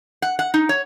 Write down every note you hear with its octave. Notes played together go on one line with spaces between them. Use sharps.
F#5
F#5
D#4
C#5